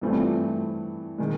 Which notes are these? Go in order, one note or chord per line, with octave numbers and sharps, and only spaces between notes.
G2 E3 A3 C4
D#3 G#3